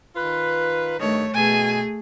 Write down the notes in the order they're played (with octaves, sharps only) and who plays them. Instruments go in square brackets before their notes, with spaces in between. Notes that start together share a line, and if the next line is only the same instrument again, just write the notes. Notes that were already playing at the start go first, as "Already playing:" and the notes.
[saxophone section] D#3 F4 B4
[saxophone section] G2 D#3 [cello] A3 C#5
[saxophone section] B2 [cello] A3 G#4 [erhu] G#5